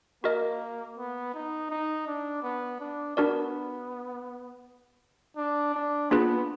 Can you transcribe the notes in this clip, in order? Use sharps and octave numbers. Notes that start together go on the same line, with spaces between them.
A#3 F#4 A#4 D#5
B3
D#4
D#4
D4
B3
D4
B3 D4 F#4 A#4 D5
D4
D4
A#3 B3 D4 F4 G#4 B4